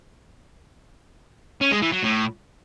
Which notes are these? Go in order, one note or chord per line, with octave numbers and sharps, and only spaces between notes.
C#4
G#3
E3
F#3
A2